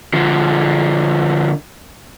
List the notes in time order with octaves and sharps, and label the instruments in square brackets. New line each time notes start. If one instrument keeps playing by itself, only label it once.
[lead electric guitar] D3 F3